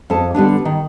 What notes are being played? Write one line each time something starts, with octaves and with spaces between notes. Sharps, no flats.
F2 A4 D#5 A5
D3 G3 B3 D4
D#3